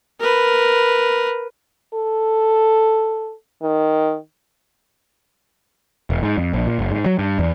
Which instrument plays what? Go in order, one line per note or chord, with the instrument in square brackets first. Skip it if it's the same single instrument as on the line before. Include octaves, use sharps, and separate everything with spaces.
[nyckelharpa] A#4 B4
[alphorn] A4
D#3
[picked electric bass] E1
G#2
F2
A#1
A#2
F#1
G#2
F#3
G2
E2